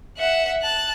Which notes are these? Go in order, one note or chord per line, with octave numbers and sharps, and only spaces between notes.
E5 F#5
A5 F#6